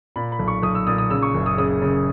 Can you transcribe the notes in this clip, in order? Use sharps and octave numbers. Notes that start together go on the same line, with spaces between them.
A#2 B5
B5
B1
C#6
B1 D#6
E6
A#2 D#6
D#6
C#3 E6
C#6
F#1
D#6
C#3 D#6
C#3